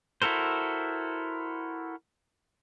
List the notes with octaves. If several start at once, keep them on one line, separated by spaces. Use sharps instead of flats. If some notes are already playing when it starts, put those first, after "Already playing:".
E4 F#4 A4 A#4 C5